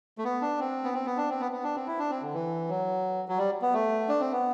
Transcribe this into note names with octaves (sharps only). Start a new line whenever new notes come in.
A3
B3
D4
C4
B3
C4
B3
D4
C4
B3
B3
D4
C4
E4
D4
C4
D3
E3
F#3
F#3
G3
B3
A3
D4
C4
B3